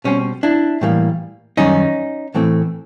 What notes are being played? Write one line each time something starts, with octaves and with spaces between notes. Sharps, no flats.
B2 G3 C4 C#4
D4 E4
A2 E3 G3 A#3
F#2 D#3 G3 C#4 D#4
A2 E3 A3 C4